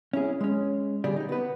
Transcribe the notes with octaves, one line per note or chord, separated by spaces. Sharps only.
C#4 E4 G#4
G#3 C#4
D3 G3 G4 G#4 D5
D#4 G4
B3 B4